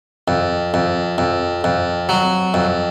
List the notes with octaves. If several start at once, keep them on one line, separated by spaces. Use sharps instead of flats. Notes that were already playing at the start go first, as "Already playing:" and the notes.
F2
F2
F2
F2
F#3
F2